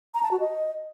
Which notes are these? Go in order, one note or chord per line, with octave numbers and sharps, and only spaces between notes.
A#5
A5
F#4
D#5